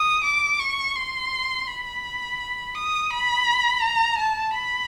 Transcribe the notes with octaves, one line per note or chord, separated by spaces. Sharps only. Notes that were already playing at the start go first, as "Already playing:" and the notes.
Already playing: D#6
D6
C#6
C6
B5
D#6
B5
A#5
A5
B5